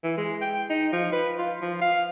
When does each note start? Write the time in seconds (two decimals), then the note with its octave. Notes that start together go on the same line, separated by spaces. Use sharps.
0.04 E3
0.18 G#3
0.42 G5
0.70 D#4
0.93 F3
1.13 B4
1.39 F4
1.62 F3
1.82 F5